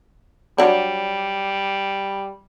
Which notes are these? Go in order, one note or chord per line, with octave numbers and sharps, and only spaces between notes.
F#3 G3 D4